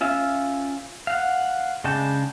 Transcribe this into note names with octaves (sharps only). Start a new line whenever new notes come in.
C#4 F4 E5
F5 F#5
C#3 G#3 D4 G5 A5